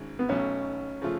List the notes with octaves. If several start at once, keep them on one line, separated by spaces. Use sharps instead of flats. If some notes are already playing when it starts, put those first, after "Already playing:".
Already playing: G#1 G#2 G#3 C#4
B3
B1 B2 F#3 A3 C#4
C#3 F3 A3 F4